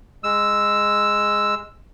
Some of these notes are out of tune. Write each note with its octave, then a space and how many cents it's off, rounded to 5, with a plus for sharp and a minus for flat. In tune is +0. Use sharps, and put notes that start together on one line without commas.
G#3 -5 E6 +0